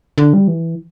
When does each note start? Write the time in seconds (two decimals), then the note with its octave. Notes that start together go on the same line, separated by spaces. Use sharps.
0.18 D3
0.33 G3
0.48 E3